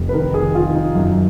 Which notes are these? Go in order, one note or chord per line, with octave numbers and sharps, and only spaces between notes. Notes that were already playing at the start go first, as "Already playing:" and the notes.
Already playing: F1
B4
D#3 A#4
G#4
D#3
F4
D#3
D#4
F#2